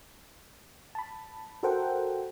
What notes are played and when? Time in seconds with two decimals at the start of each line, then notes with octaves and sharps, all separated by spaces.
0.95 A5 B5
1.63 F#4 A4 A#4 C5 F#5 G5